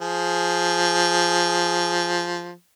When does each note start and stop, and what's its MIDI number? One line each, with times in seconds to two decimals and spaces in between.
0.01 2.51 53
0.01 2.51 68